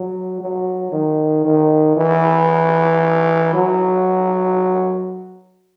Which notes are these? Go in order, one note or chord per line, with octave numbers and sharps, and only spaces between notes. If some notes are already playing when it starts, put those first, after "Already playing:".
Already playing: F#3
F#3
D#3
D#3
E3
F#3